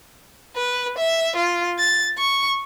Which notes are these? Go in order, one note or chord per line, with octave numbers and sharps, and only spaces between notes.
B4
E5
F4
A6
C#6